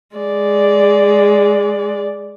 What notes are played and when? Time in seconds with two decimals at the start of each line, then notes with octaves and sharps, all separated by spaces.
0.16 G#3 D5